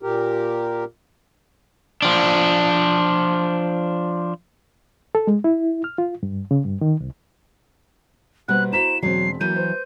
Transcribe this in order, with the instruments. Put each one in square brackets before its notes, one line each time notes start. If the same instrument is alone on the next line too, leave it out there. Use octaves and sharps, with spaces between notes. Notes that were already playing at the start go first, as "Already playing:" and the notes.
[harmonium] A#2 G4 A#4
[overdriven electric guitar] F3 D4
[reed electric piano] A4
G#3
E4
F6
F4
G2
C#3
G2
D#3
C2
[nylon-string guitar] B2 G3 A#3 [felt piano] B4 C5 F#5 [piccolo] F#6
[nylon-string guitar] E4 F#4 [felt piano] C5 A#5 B6 [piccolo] E7
[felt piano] E1 C4 C5 [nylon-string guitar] F#3 [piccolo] C7
[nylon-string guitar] E3 F#3 [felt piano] A#3 D#7 [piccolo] G6
[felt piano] B4 C5